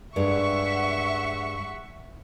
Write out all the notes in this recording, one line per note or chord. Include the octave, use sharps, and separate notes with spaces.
G2 G#3 E5 F#5 C#6